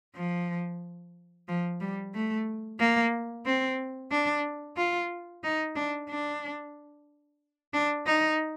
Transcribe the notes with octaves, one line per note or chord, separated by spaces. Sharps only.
F3
F3
G3
A3
A#3
C4
D4
F4
D#4
D4
D4
D4
D#4